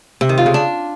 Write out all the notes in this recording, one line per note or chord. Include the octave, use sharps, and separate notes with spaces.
C3
D#3
F4
C#3
D4